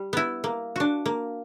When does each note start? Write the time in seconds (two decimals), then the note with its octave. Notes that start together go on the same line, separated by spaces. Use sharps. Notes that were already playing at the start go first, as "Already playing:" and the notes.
Already playing: G3
0.13 B3 E4
0.44 A#3
0.76 D4 F#4
1.06 A#3